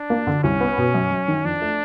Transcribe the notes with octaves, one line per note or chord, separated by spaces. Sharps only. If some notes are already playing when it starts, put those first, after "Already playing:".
Already playing: D4
A#3
D3
C2 C#4
B3
B2
F#2
F#2
D#3
F2 D4
A3